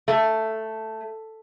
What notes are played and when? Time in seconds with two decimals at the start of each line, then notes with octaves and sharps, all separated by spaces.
0.08 A3